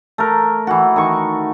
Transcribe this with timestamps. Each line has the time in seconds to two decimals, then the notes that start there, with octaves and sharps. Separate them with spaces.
0.18 A3 A#4
0.67 E3 F#4
0.96 D#3 C#6